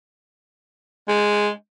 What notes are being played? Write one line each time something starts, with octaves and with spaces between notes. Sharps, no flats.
G#3